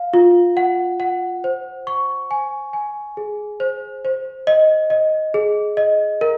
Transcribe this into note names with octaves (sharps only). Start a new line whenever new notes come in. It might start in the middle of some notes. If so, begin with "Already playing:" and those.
Already playing: F5
F4
F#5
F#5
C5
C#6
G#5
G#5
G#4
C5
C5
D#5
D#5
G#4
D#5
A#4